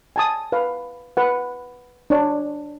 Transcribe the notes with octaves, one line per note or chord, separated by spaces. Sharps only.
G#5 A5 D#6
B4 F5
B4 F#5
D4 C#5